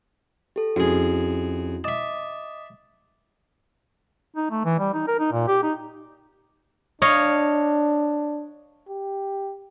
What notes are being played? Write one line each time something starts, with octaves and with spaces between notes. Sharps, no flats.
G4 A4
F2 C#4 E4 F#4 G#4
D#5 E5 A5 D6 D#6
D#4
A3
E3
G3
D#4
A#4
D#4
A#2
G4
D#4
D4 C#5 D#5 F5
G4